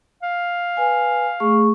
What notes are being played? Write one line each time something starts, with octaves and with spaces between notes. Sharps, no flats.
F5
B4 G#5
A3 G#4 C#6